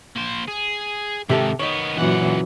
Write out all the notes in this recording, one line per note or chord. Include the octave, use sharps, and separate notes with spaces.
A#3 C5
G#4
G#2 C3 D#3 G4 A4
D#3 B3 C#5 D#5
C#2 F#2 A#2 E3 F#5